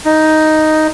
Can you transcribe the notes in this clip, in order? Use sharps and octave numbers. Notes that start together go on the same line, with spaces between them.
D#4